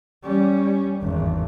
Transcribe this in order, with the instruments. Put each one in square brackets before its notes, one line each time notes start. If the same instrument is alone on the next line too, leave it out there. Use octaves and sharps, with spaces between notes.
[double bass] G3 C#4
G#1 E2